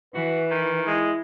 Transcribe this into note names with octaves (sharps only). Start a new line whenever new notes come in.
E3 F#4 B4
D#3
G#3 E4